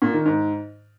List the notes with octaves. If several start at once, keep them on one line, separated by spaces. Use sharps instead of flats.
A#2
D#3
G#2